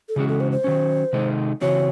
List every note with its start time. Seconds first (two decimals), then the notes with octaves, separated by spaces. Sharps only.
0.09 A4
0.16 C#3 E3 G#3 C#4 F#4 G#4
0.29 A4
0.40 C5
0.52 C5
0.64 D#3 F#3 C#4
1.13 C3 D#3 G#3 D#4 A4
1.61 C#3 E3 C4 F#4 C#5